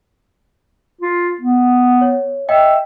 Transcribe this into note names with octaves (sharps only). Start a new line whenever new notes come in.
F4
B3
C#5
D#5 E5 G5